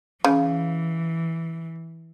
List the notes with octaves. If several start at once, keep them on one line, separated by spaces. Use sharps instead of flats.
C#3 E3